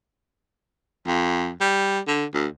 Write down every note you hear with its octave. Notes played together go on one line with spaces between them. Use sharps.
F2
G3
D3
D2